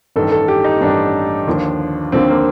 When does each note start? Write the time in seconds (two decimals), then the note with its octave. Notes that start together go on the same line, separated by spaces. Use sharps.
0.16 A1 G2 D#3 A4
0.32 A4
0.48 G4
0.64 D#4
0.81 A1 G2 D#3 D4
1.47 D#2 D3 F3
2.12 D#2 D3 F3 C4
2.29 A#3